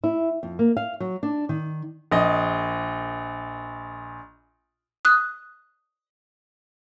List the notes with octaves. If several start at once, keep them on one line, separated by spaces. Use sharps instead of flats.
E4
F2
A#3
F5
F#3
D4
D#3
A#1 D#5
D#6 F#6